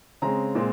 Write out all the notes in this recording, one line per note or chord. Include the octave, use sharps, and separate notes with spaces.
C#3 G#3 C4 A#5
A#2 G#3 C4